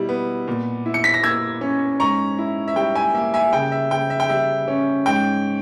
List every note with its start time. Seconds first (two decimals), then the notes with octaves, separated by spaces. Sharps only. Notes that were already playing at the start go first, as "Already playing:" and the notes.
Already playing: B2 G3 E4
0.09 B3
0.48 A#2
0.86 E4
0.94 C#7
1.04 B6
1.14 A#6
1.23 A#3 E6 G#6
1.61 C#4
2.00 G#2 A#5 C#6
2.38 E4
2.68 E5
2.76 G3 G5
2.95 E5 G#5
3.14 A#3 E5
3.34 E5 G#5
3.53 C#3 G5
3.72 E5
3.91 C#3 G5
4.10 E5
4.20 G5
4.29 G3 E5
4.68 C#4
5.06 G#2 G5